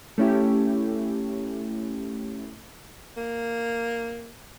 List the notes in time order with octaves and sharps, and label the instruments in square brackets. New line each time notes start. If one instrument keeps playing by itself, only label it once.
[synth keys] A3 C#4 E4 G4
[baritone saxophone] A#3